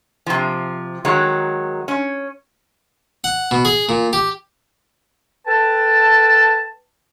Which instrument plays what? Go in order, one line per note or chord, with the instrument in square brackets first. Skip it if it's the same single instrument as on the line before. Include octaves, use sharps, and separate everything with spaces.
[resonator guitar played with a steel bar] C3 F3
D#3 F#3 G#3
C#4
[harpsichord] F#5
B2
G#4
A#2
G4
[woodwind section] A4 B4 G5 A5